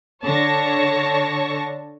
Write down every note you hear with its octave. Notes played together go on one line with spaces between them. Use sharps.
D3 C#5 A5 C#6 A#6